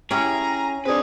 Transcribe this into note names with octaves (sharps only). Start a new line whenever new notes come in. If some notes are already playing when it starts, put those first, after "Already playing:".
C#4 E4 G4 G#4 A#5
C4 D4 G#4 B4 D5